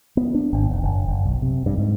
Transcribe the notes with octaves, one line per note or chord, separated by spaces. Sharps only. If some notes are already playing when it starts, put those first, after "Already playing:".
B3
D4
G#1
E1
F#1
F#1
B1
C3
G2
G#2